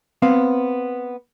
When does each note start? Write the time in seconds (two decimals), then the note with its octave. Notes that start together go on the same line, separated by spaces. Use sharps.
0.22 B3 C4 F5